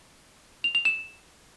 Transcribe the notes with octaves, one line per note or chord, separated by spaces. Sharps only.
F7
F7
E7